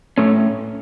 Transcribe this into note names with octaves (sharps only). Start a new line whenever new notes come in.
A2 A3 C#4